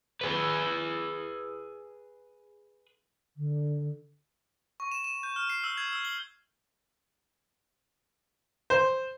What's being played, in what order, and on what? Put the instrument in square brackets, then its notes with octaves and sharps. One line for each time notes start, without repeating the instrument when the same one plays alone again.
[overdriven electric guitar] G#4 B4
[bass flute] D3
[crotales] C#6
E7
E7
G6
F6
C7
E6
G#6
E6
G7
[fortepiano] C5